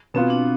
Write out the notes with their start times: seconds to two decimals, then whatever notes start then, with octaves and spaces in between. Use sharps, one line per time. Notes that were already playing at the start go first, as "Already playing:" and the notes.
0.14 B2 B3 C4 F4
0.30 D4